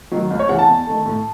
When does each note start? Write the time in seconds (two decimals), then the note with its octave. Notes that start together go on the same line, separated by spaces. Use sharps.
0.11 D#3 F#3
0.31 C#2
0.39 C#5
0.49 C#3 E3 F#5
0.59 A5
0.68 E2
0.87 D#3 A3
1.06 A2